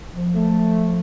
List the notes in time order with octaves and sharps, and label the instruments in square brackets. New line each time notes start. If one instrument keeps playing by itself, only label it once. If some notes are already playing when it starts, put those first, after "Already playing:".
[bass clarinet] F3
[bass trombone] A3